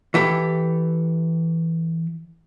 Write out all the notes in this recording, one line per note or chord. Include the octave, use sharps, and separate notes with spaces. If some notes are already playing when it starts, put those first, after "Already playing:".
E3 E4 G4 A4